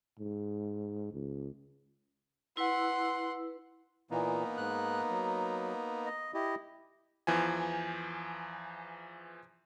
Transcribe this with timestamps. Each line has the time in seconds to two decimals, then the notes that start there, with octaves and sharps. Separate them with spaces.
0.20 G#2
1.13 C#2
2.57 E4 B4 F#5 C6 E6
4.11 A#2 E3 A#3 B3 D#4
4.57 G#2 F#6
5.10 F#3
6.06 D#5
6.34 E4 G4 D#5
7.27 E2 E3 F3 G#5